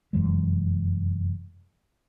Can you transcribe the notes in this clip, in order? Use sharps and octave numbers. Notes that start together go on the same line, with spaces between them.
F1 F#2 E3 G#3